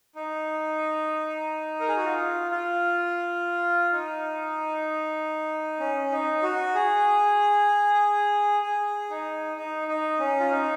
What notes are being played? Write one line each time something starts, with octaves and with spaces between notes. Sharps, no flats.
D#4
A#4
G#4
F#4
F4
F4
D#4
C#4
D#4
F#4
G#4
G#4
D#4
D#4
D#4
C#4
F4
D#4